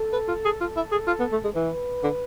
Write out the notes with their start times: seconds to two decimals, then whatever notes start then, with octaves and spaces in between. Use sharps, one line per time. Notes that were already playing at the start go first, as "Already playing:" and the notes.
Already playing: A4
0.13 B4
0.28 F4
0.45 G#4
0.60 F4 A4
0.76 E4
0.91 G#4
1.07 F4
1.20 B3
1.32 A3
1.44 G#3
1.55 E3 B4
2.03 D3